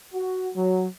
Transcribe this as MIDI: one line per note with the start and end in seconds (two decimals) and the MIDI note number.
0.14 0.48 66
0.55 0.85 54